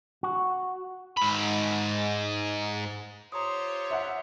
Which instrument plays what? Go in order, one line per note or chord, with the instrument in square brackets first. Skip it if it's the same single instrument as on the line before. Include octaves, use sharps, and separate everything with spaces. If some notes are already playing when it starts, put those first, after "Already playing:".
[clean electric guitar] F#4
[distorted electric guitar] G#2 B5
[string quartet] F4 G4 C5 [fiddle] C#5 [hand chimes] A#5 C6 D#6
[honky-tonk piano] E5 F#5